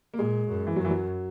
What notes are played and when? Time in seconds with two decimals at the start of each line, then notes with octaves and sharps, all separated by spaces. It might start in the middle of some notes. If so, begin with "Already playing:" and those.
0.14 A#3
0.18 A#2 G#3
0.48 F#2
0.67 E3
0.76 F#2 F#3
0.85 E3
0.90 F#3